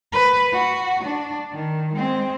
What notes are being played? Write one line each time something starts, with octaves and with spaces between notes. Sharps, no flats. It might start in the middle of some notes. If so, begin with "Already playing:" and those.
B4
F#4
D4
D#3
G#3 C4